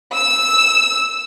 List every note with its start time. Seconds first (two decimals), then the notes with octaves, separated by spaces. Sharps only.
0.14 E6